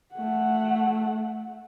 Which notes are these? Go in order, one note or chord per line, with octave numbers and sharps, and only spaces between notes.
A3 F#5